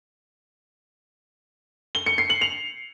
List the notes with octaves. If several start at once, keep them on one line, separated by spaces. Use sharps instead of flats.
G7
C#7
C7
F#7
F7